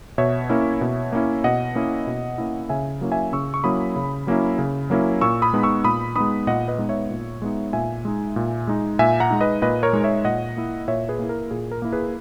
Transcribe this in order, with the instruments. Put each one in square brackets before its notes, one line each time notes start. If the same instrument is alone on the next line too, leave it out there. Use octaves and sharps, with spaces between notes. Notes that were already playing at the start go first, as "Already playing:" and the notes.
[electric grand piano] B2 C#5 E5
A#3 C#4 E4
B2
A#3 C#4 E4
B2 D#5 F#5
A#3 C#4 E4
B2
A#3 C#4 E4
C#3 E5 G#5
F#3 A#3 C#4 E4
E5 G#5
C#3 C#6 E6
C#6
F#3 A#3 C#4 E4 B5 D#6
C#3
F#3 A#3 C#4 E4
C#3
F#3 A#3 C#4 E4
A#2 C#6 E6
B5 D#6
G#3 B3 D#4
C#6 E6
A#2 B5 D#6
G#3 B3 D#4 B5 D#6
A#2 D#5 F#5
B4 D#5
G#3 B3 D#4
C#5 E5
A#2
G#3 B3 D#4
A#2 E5 G#5
G#3 D#4
A#2
G#3 D#4
A#2 E5 G#5
F#5 A#5
G#3 D#4
B4 D#5
A#2 B4 D#5
A#4 C#5
G#3 D#4
C#5 E5
A#2 D#5 F#5
A#3 E4
A#2 C#5 E5
G#4 B4
A#3 E4
A#4
A#2 G#4
A#4
A#3 E4
G#4 B4